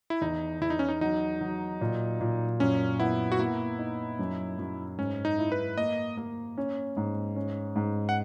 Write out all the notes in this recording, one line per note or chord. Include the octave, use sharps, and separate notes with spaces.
E4
E2 D#4
E2 E4
D#4
C#4
D#4
F#3 D#4
F#3
A#2
A#2
F#2 C#4
B3 E4
F#4
A#3 E4
D#4
F#2
F#2
G#2 C#4
D#4
E4
B4
A#3 D#5
A#3
C#4
G#2
C#4
G#2
F#5